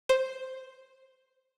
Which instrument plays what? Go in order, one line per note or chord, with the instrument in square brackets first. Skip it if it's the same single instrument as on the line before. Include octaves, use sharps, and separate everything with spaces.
[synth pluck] C5